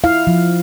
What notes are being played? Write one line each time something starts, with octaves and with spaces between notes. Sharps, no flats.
E4 F5
F3